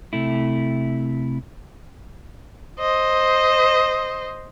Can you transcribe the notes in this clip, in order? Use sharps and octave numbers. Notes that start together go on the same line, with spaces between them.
C3 A3 E4
C5 D#5